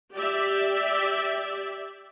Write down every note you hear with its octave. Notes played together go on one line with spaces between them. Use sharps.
G4 D5 E5